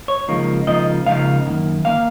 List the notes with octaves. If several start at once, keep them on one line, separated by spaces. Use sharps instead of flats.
C#5
C#2 C#3 F3 A#3 D#4
C#2 C#3 F3 A#3 D#4 D#5
C#2 C#3 F3 A#3 D#4 F5
F#2 D#3 A#3
D#3 A#3 F5